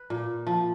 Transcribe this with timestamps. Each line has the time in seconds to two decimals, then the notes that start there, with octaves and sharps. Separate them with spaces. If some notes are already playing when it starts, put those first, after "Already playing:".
Already playing: B4
0.10 A#2
0.47 F3